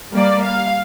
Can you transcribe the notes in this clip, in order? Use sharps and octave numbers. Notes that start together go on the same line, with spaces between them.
G3 A#3 D5
F5